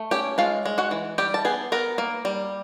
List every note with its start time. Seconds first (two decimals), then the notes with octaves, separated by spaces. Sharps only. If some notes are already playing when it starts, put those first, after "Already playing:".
Already playing: A3
0.11 C#4 G4 G5
0.38 G#3 F4 F5
0.65 G#3
0.78 F#4 F#5
0.91 E3
1.18 G3 G4 G5
1.34 A5
1.45 B3 G#4 G#5
1.72 B3 A#4 A#5
1.98 A#3
2.25 G3